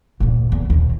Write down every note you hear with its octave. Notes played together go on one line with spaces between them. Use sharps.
D2 A#2
E2
D#2 A#2